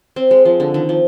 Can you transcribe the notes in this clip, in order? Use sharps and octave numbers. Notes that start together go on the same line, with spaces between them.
C4
G#3
F3
D3
D#3
F3